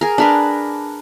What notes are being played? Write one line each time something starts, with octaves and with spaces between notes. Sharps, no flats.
G#4 A#4
D4 A#4 B4